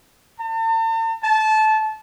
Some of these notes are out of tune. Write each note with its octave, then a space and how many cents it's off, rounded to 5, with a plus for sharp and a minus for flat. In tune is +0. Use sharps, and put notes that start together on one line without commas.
A5 +45
A5 -20